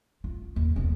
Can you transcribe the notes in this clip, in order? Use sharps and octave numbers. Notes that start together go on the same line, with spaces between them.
F4
D#2
D#1 B3